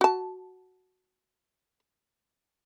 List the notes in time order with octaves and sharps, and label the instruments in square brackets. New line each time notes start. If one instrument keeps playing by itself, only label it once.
[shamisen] F#4 A5